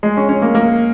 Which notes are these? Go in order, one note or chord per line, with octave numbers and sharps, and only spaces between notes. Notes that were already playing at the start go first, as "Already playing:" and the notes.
G#3
C#4
C#4
A#3
A#3